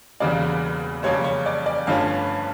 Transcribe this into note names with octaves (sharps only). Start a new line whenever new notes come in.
E1 E2 C#3 G3 A#3 D5
F2 C#3 G3 A#3 C#4 C#5
C#5
D5
D5
G1 G2 F3 A3 C#4 F5